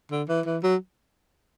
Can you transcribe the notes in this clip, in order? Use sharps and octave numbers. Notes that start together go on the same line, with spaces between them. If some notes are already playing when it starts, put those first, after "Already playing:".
D3
E3
E3
F#3